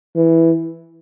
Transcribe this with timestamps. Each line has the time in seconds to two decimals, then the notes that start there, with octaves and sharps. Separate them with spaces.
0.16 E3